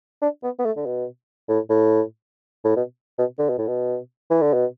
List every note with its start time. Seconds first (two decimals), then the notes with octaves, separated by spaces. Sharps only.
0.22 D4
0.44 B3
0.59 B3
0.65 A3
0.77 D3
0.86 B2
1.49 A2
1.70 A2
2.65 A2
2.76 B2
3.19 B2
3.39 D3
3.50 B2
3.59 A2
3.68 B2
4.30 E3
4.42 D3
4.54 B2